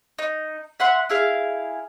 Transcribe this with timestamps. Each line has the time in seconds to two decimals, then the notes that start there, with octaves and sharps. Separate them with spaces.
0.19 D#4
0.80 E5 F#5 C6
1.09 E4 G#4 F5